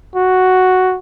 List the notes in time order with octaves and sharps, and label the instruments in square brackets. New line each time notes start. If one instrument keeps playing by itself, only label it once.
[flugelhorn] F#4